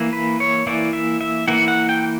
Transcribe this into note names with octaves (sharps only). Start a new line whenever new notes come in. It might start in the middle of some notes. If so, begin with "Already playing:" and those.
Already playing: E3 A#3 E4
B4
C#5
E3 A#3 E4 D5
E5
E5
E3 A#3 E4 F#5
F#5
G5